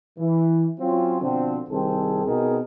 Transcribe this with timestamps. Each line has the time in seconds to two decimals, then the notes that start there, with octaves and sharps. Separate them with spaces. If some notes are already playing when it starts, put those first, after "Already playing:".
0.18 E3
0.79 F#3 C4 C#4 F4
1.21 B2 D3 F3 C4
1.69 C2 D#3 C4 G#4 A4
2.25 B2 C4 D#4 G#4 A#4